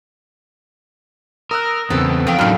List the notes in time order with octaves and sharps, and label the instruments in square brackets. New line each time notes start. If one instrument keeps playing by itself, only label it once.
[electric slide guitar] A#4 [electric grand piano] D#6 E6 F#6
[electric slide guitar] E2 C#3 [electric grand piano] B3 C4 B4 [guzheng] A4
[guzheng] F2 F5 [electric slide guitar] A#4 G5
[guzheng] F#2 A2 [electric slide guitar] F#3 D4 D#4 [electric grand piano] A#5 F6